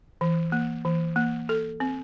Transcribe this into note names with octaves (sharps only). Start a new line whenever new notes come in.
E3
A#3
E3
A#3
A4
C4